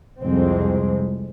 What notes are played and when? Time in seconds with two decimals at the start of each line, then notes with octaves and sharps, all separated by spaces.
0.21 C2 F2 G#3 C4